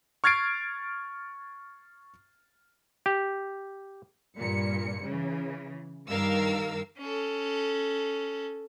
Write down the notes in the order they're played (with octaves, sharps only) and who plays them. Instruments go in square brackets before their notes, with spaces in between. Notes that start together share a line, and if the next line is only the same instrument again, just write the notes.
[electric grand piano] C#6 F6 G#6 A6 C7 D7
[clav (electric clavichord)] G4
[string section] G2 A#2 C#7
C#3 E3
G2 D#3 A#4 F5 E6
[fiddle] C#4 A4